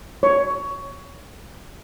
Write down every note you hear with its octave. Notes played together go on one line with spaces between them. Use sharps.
C#5 C#6